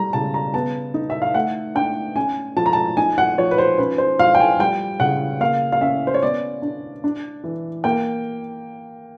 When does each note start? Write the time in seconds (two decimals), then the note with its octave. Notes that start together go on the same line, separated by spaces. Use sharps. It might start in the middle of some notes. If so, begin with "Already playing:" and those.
Already playing: G3 A#5
0.13 C#3 A5
0.34 A#5
0.54 B3 A5
0.94 D#4
1.10 E5
1.22 F5
1.34 A3 F#5
1.75 D4 G5
2.16 C#4 G#5
2.57 F3 A5
2.66 A#5
2.73 A5
2.97 D#4 G#5
3.18 F#5
3.38 F3 C#5
3.51 B4
3.58 C5
3.78 C#4 B4
3.98 C5
4.19 F3 F5
4.35 G5
4.40 G#5
4.59 G3 G5
5.00 C#3 F#5
5.40 A#3 F5
5.72 F5
5.81 C#4 E5
6.07 C5
6.14 C#5
6.22 B3 D5
6.62 D4
7.04 D4
7.44 E3
7.84 A#3 G5